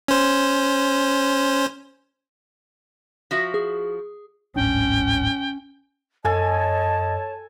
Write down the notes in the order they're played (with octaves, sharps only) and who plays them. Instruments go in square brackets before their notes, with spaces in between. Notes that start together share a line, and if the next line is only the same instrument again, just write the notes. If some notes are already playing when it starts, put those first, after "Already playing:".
[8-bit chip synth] C#4 C5
[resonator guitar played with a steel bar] F3 F#4 E5
[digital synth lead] G#4
[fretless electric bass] D1 G#1 D4 [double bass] C#4 [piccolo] G5
[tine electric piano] F#2 [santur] A4 G#5 [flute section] C#5 A5 [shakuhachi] D#5